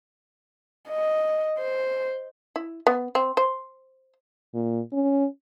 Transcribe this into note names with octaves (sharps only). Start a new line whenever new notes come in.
D#5
C5
E4
B3
C4
C5
A#2
C#4